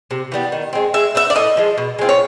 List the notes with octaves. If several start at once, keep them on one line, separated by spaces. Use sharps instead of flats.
C3
E3 G3 B3
D#3
G#3 C4
G#3 E5
B3 D#4 F#4 E5
D5
A2 D#5
F3 G#3
B2
G#3 C4 F4
C#5